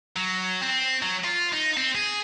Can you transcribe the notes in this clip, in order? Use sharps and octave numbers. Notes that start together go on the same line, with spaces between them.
F#3
C4
F#3
F4
D#4
C4
G#4